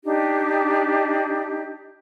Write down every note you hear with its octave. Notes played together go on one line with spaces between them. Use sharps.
D4 D#4 G4